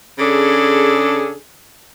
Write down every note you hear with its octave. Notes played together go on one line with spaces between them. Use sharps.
C#3 D4 G#4 A4